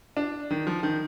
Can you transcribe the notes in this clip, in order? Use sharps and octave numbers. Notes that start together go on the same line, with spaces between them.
D4
D#3
F3
D#3